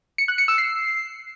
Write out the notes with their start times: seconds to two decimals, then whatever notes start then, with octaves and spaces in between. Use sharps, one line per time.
0.18 C#7
0.28 F#6
0.38 C#7
0.48 E6
0.58 C7